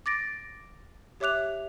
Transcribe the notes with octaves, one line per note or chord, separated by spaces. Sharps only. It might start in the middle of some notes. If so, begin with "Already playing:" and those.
D6 A6 A#6 D7
G4 C#5 E5 D6 F#6 F7